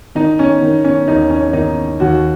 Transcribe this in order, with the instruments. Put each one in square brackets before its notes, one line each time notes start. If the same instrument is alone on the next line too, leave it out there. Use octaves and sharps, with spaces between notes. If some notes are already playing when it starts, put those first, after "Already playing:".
[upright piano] D#3 D#4
C#4
D#3
C#4
D#2 D#4
C#4
D#3 D#4
D#2 F#4